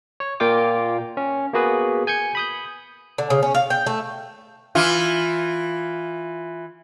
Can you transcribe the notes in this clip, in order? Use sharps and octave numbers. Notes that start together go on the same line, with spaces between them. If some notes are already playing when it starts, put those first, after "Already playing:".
C#5
A#2 A#3 F4 G5 D6
C#4
A#3 B3 F#4 G#4 B4
G#5 G6 G#6 C#7
B5 D#6 G6
D3
C#3
C#4
F5
G5
A3
E3 F4